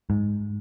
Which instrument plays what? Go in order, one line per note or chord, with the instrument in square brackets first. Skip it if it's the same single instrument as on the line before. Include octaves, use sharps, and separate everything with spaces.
[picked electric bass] G#2